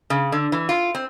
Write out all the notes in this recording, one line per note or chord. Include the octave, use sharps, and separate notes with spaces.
C#3
D3
E3
F4
C4